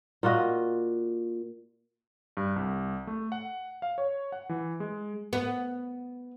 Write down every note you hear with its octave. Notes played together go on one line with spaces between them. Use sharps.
A#2 F4 F#4 D#5
G2
C2
A3
F#5
F5
C#5
F#5
E3
G#3
B3